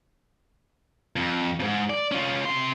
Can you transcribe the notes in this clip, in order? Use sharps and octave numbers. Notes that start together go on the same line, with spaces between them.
F2
F2 G#2
D5
C#4 F4
C3 C6